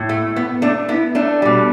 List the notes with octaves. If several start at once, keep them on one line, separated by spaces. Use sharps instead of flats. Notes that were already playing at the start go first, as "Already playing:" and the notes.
Already playing: A2
A3
B3
A3 D4
B3 E4
A3 D4
B2 G3